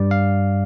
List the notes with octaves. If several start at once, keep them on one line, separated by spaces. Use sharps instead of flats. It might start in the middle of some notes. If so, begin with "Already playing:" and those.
Already playing: G2 G3 D5
F5